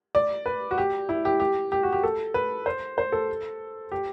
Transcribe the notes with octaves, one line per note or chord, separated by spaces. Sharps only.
D5
B4
F#4
G4
E4
G4
G4
G4
F#4
G4
A4
B4
C5
C5
A4
G4